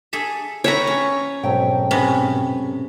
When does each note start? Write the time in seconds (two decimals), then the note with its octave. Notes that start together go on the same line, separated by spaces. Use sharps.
0.13 G#4 A4 E5
0.64 B4 C#5 E5 G5 A#5
0.87 C#4
1.43 F2 G#2 B2 F#3 G5
1.91 C3 B3 C#4